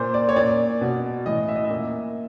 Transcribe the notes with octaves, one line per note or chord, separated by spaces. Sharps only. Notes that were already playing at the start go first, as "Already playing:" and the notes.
Already playing: A#2 C5
D5
C#5
A#2 D5
B2
A2 E3 D#5
E5
D#5
E5
A#2